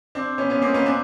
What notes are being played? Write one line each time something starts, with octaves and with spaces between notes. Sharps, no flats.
C4 D4
B3 C#4
B3 C#4
A#3 C4
B3 C#4
C4 D4